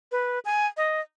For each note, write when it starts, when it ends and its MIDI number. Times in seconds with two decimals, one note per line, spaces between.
0.12 0.39 71
0.45 0.67 80
0.77 1.01 75